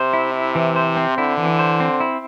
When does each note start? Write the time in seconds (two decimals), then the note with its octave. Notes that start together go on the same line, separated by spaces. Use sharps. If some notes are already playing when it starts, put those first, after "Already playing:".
Already playing: C3 C5
0.13 E4
0.34 E4
0.55 E3
0.76 C5
0.97 C4
1.18 D3 E4
1.37 E3
1.59 C5
1.80 C4
2.00 E4